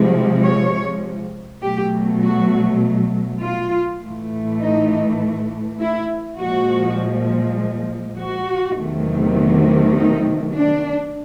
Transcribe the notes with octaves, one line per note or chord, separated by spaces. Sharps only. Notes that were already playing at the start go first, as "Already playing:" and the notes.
Already playing: C3 F3 G#3
C#5
B2 F#3 A3 G4
F#4
F4
A2 E3 A3
D#4
E4
A#2 F3 G#3 F#4
F#4
E2 C3 D#3 F#3 A3
D#4
D4